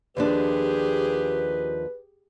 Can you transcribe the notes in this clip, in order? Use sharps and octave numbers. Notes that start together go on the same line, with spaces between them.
D#2 F3 D4 G4 G#4 B4